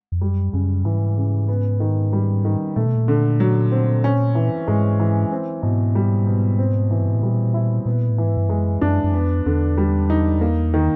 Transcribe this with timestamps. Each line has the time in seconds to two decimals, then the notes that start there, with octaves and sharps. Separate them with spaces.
0.12 F2
0.21 F#2 G3
0.53 F#2 C#3
0.85 G#2 E3
1.17 C#3
1.48 B3
1.80 D#3
2.13 G3
2.45 D#3
2.76 A#2 A3
2.86 B2
2.95 A#2
3.08 D3
3.40 F#3
3.72 C4
4.04 C#4
4.35 E3
4.68 G#2 G#3
5.00 E3
5.32 C4
5.62 G#2 B2
5.95 G3
6.27 B2
6.59 C4
6.91 E3
7.01 G2
7.09 G#2
7.15 A2
7.22 A#2 G3
7.54 E4
7.86 A#2 B3
8.10 A2
8.18 G#2 E3
8.37 G2
8.49 F#2 G#3
8.81 F#2 D4
9.04 F#2
9.13 F2 B3
9.46 E2 D3
9.78 G3
10.10 D#4
10.41 A#3
10.74 D#3